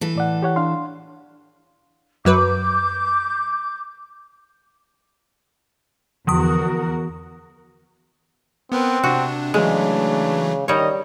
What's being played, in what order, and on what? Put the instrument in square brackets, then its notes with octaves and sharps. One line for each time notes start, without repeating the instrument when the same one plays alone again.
[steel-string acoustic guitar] E3 A4
[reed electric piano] A2 D5 F#5
G4 C#5 F#5
D4 F5 C6
[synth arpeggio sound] F#2 F#3 B4 [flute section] D6 G6
[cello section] E2 F#4 A#4 [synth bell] D3 F3 D#6
[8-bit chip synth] B3 A#4 B4 [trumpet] C4
[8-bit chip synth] C3 D4 [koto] F#4
[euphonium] C#3 [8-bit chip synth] E3 F#3 A3 [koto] G#3 [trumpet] D4
[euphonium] D#3 [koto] G3 C#5 [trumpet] D#5